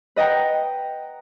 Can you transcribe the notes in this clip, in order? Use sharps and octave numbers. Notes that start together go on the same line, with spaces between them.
B4 D#5 F#5 G5 A#5